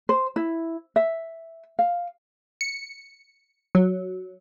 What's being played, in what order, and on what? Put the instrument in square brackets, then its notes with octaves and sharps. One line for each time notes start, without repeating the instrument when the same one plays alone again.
[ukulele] C5
E4
E5
F5
[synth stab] C#7
F#3